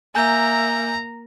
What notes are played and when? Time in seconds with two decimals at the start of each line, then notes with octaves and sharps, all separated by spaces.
0.15 A#3 E5 G#5 A#5 G6